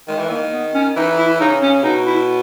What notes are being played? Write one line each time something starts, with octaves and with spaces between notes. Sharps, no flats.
D#3 G#3
E3
D#3 A#3
B3
C#4
E3 D#4
E4
C#3 D#4
C#4
B2 D#4
E4